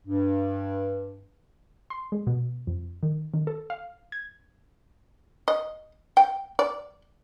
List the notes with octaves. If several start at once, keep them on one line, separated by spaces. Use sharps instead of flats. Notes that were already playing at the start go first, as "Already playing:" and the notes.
G2
C6
G#3
B2
F2
D#3
D#3
A4
F5
G#6
D#5
G5
D5